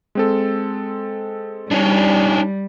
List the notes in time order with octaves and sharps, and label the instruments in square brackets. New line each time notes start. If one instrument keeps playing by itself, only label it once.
[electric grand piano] G#3 C4 A4
[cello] G3 [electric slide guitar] D4 D#4 C#5